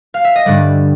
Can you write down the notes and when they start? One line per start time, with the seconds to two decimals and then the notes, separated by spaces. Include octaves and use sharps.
0.14 F5
0.24 E5
0.35 D#5
0.46 G2 D3 G3 D5